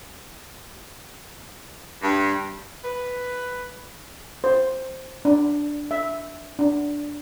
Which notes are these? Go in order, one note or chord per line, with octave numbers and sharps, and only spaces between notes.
G2
B4
C5
D4
E5
D4